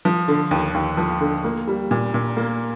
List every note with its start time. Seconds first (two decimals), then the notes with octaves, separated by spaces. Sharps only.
0.05 F3
0.28 D3
0.51 D#2
0.74 D#2
0.97 F3
1.21 D3
1.44 A#3
1.67 G3
1.91 A#2
2.14 A#2
2.37 A#3